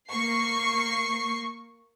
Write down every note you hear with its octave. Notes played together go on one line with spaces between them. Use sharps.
A#3 C#6 C7